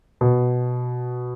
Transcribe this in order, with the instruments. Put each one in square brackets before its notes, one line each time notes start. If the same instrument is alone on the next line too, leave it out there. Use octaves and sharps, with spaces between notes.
[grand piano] B2